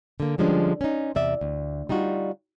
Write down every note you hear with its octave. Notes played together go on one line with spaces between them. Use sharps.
D3 A#3
D3 F3 G3 G#3 C#4 D4
C#4 D#4
E2 C3 D5 E5
D2
G3 D#4 F4 F#4